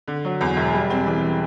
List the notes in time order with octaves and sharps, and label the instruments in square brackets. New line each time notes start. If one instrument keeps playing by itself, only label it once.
[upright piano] D3
F#3
E2
E1
G3
C4
E3